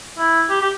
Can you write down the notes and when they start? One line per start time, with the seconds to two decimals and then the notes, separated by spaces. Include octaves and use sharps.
0.18 E4
0.50 G4
0.61 G4